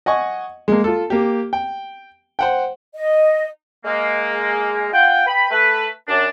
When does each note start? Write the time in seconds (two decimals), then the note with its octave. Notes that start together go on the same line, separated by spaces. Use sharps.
0.06 D#5 F#5 G#5 C#6
0.68 G#3 A#3
0.84 F4 A4
1.10 A#3 G4
1.53 G5
2.39 C5 F#5 G5
2.95 D#5
3.85 G#3 A#3
4.93 F4 F#5 G5
5.27 B4 G5 B5
5.51 A3 A4 B4
6.08 F#2 D4